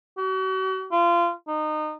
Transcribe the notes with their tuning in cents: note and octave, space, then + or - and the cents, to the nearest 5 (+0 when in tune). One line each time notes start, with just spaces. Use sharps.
F#4 +40
F4 -25
D#4 -25